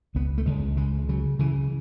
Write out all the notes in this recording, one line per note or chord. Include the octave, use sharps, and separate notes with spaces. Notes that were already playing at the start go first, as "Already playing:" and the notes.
C#2 B3
A3
C#2 G#3
C#3 G#3
C#3 F#3
C#3 E3